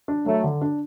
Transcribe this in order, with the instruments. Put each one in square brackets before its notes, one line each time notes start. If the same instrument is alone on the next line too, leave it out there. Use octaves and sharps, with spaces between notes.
[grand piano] D4
[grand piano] F#3 [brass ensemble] A3
[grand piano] D3
D4